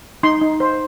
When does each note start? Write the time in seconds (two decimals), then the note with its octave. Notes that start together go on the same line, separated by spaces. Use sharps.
0.23 D#4 C6
0.41 D#4
0.60 C5